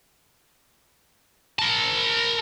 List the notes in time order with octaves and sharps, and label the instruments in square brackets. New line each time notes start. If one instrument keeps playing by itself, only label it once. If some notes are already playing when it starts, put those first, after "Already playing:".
[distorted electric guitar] A#4 A5